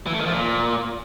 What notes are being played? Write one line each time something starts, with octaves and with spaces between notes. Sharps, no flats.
E3
A3
D#3
F3
A#2